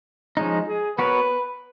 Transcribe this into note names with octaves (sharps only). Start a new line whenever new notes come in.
F3 G#3 C#4 D#4
G#4
B3 F#4 A#4 B4 C#5